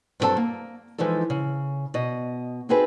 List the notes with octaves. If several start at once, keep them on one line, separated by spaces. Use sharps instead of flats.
G2 F#3 G3 C4 A4 A5
A#3
E3 F3 G#3 D#4 A4
C#3
B2 D#5
C4 D#4 F#4 G#4 A4 B4